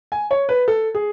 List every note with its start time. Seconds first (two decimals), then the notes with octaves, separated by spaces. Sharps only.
0.12 G#5
0.31 C#5
0.49 B4
0.68 A4
0.95 G#4